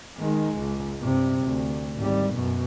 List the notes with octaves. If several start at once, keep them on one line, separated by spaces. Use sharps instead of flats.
D#3 G#3
C#2
G2 C3
D2
G#1 G3
F#2 B2